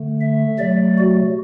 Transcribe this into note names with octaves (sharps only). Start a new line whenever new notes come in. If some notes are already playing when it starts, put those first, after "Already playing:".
Already playing: D3 A3
E5
C3 F#3 A3 D5
F#4